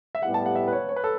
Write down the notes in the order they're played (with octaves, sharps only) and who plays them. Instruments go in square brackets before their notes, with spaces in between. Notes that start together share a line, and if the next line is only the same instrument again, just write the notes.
[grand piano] E5
[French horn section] A2 G3 B3 E4 G4 [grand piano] F#5
[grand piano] A5
F#5
E5
B4
C#5
C#5
B4
A4